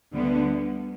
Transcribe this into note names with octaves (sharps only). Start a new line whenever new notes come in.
D2 D3 G3 B3